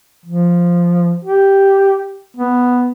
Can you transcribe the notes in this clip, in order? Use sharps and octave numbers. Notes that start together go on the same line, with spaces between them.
F3
G4
B3